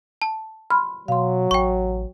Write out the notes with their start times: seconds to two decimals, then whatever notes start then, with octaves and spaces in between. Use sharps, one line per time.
0.22 A5
0.70 B5 C6 F6
1.08 B2 F#3 F5 C6
1.51 A1 G5 C#6